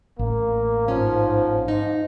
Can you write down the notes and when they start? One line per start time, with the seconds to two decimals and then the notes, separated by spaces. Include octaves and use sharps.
0.19 A1 A#3
0.88 G#2 F3 C#4
1.68 G#2 D#4